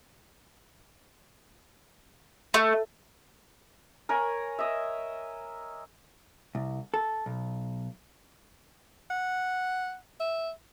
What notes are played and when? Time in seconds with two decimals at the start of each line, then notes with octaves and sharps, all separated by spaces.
2.54 A3
4.09 A#4 C#5 G#5 B5
4.59 D#5 E5
6.55 C2
6.94 A4
7.26 B1
9.11 F#5
10.21 E5